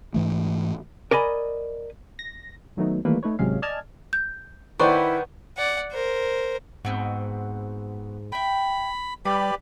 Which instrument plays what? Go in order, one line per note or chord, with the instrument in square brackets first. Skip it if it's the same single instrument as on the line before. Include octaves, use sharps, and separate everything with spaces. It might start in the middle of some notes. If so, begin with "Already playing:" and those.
[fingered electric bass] G#2 E3 A3
[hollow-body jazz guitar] A#4 D5 D#5 G#5 B5
[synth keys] A#6
D#3 F#3 A3 B3 D#4
D#3 E3 G3 A3 A#3 B4
A3 D#4 B4 C#5
G#1 C3 F#3 G#3 C#4 F5
D5 D#5 G#5 A5 F6 G#6
[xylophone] G6
[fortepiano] D#3 C5 D5 [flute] E4 [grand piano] B4 F#5 [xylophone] C#6
[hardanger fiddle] D5 F#5
A#4 C5
[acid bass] G#2 [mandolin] B3 C4 F#4
[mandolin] E4 G5 [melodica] B5
[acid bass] G3 [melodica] G4 B4 D5 [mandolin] B5